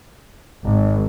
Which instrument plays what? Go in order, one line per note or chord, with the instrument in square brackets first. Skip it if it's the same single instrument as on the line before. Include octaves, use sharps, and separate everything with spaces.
[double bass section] G#1